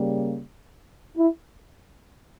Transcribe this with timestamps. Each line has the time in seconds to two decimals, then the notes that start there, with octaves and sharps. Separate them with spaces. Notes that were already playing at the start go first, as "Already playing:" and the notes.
Already playing: C#3 G3 A#3
1.16 E4